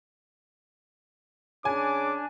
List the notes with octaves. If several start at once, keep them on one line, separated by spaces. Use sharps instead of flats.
C#3 D4 G#5 D6